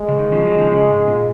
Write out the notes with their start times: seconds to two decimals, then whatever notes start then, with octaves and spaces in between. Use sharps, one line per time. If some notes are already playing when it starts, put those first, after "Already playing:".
Already playing: G#3
0.08 C#3
0.19 D#3
0.32 C#3 F3
0.45 D#3 F#3
0.58 C#3 F3
0.71 C#3
0.90 G#2
1.07 A#2